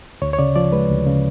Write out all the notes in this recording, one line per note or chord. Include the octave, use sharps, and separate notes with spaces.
D2 C#5
C#5
C#3 D5
F3 D5
G#3 B4
D2
C#3